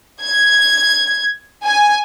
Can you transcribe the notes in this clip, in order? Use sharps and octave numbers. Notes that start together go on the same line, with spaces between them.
G#6
G#5